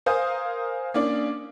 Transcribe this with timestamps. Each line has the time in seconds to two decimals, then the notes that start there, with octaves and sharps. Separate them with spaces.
0.06 A#4 C5 F5 G#5 D#6 G6
0.94 A#3 C#4 D4 D5